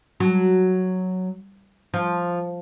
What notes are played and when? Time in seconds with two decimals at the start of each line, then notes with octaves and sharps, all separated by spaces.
0.20 F#3
1.94 F3